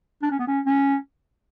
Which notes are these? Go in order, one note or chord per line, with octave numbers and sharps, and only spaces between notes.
D4
C#4
B3
C#4
C#4